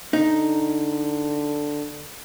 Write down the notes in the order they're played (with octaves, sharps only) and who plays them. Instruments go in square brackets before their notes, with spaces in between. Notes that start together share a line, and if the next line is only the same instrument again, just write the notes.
[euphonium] D3 [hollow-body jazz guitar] D#4